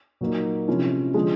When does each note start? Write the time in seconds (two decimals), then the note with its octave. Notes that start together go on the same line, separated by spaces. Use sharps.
0.21 A#2 F#3 A#3 D#4
0.68 C3 F3 G#3 C#4 E4
1.14 D3 F3 G#3